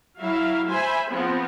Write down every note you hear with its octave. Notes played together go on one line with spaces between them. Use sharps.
F#3 E4 E5 F5
C5 E5 G#5 B5
F3 B3 C4 F4 G#4